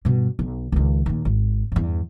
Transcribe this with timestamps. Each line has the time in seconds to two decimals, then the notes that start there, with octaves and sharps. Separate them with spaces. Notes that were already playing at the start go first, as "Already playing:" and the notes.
0.05 G2 B2
0.39 B1
0.72 C#2 D#3
1.06 D#2 A#2
1.25 G#1
1.72 E2 G2